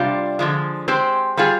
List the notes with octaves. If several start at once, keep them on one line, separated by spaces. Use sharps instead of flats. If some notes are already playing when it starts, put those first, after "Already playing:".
Already playing: C3 G3 D4 F4
D3 F3 G#3
G#3 C4 G4 C5
G3 C4 F4 G#4